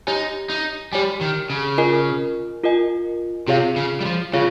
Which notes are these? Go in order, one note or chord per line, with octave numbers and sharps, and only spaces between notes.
D#4 G4 C#5 G#5
D#4
G3 G4 C#5 G#5
D#3
C#3
F4 A#4 D#5 G#5
F4 A#4 D#5 G#5
C3 F4 G#4 C#5 F5
C#3
G3
F3
C#3 F4 G#4 C#5 F5